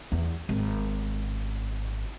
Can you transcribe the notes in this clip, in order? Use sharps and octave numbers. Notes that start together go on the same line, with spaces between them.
E2
G#1